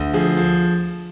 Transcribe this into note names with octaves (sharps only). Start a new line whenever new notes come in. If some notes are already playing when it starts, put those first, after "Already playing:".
Already playing: D2
F3 G#4
F3